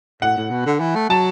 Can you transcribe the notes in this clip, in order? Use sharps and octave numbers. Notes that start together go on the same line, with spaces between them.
A2 F#5
A2
B2
D3
E3
A3
F#3 A5